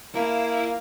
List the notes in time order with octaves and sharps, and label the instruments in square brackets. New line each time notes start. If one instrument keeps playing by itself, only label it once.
[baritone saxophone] A#3 [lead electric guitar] E4 [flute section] F5